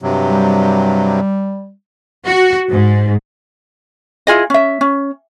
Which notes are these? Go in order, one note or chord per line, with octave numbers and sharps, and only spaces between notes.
G2 C3 F#3
G3
F#4
G#2
E4 F4 G#4 D#5
C#4 E5
C#4